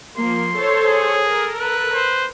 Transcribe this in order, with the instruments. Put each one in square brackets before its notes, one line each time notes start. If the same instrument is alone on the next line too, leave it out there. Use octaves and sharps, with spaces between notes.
[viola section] F3 A#3 [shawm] C6
[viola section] A4 C5 C#5
[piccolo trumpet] G#4
[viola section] A4 A#4
[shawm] B4
[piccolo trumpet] C5